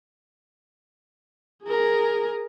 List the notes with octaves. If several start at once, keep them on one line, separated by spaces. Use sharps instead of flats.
G#4 A#4